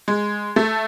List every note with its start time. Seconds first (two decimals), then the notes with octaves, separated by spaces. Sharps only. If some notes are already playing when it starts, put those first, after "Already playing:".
0.08 G#3
0.56 A3